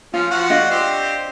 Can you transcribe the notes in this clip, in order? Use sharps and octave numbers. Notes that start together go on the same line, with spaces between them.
F3 C#4 F4
F3 F#4 F#5
D4 D#5 F5
C4 G4 C5